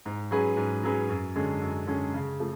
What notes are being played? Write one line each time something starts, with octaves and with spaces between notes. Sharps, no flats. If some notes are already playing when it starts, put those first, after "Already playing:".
G#2
F#3 C#4 G#4 B4
G#2
F#3 C#4 G#4 B4
F#2
D3 G#3 C#4 G#4
F#2
D3 G#3 C#4 G#4
C#3
F3 A3